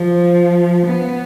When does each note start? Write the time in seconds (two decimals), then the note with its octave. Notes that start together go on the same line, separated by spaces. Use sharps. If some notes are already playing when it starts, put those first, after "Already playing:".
Already playing: F3
0.86 B3